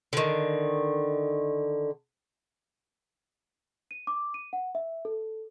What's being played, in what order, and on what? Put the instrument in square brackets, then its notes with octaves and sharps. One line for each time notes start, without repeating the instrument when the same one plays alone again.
[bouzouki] D3 D#3
[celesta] D#7
D6
D#7
F#5
E5
A4